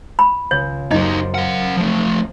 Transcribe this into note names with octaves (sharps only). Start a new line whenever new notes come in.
B5
C#2 C#5
F#2 D#4 G4 C5 D#5
A#4 F5 F#5
F3 A3